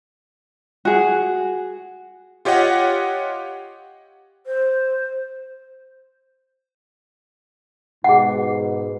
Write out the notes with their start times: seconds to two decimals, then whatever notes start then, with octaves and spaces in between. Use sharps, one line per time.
0.85 F#4 G#4
2.45 F4 G4 C#5 D#5 F#5
4.46 C5
8.04 G#2 B2 G#4 F#5